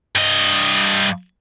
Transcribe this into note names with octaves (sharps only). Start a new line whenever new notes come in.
G2 D#5